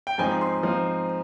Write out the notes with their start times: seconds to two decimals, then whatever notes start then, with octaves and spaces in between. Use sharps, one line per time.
0.07 G5
0.18 G#2 F3 C4 D#4 G#5
0.41 C6
0.63 F3 C4 D#4